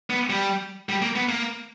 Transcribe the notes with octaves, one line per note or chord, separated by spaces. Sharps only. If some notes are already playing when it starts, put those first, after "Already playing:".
B3
G3
G3
A#3
B3
A#3